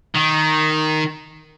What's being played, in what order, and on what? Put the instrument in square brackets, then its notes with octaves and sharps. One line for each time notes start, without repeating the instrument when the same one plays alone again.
[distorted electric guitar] D#3